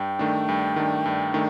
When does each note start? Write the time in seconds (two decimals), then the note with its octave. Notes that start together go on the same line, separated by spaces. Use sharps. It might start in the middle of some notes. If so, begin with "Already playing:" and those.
Already playing: G2 G5
0.19 D#3 A3 D4
0.49 G2
0.76 D#3 A3 D4
1.06 G2
1.34 D#3 A3 D4